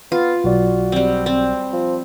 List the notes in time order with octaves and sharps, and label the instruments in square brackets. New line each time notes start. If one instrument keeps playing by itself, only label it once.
[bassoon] B3 [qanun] F4
[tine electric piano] B1 D5 [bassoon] F#4
[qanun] G3 C4
C4
[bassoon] F3